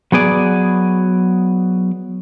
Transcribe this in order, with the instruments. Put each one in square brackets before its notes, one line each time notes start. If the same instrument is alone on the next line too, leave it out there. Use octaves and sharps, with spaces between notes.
[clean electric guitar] F#3 B3 G#4 D5